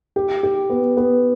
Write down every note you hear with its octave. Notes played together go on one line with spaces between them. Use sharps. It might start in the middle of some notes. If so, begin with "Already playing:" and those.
G4
G4
B3
B3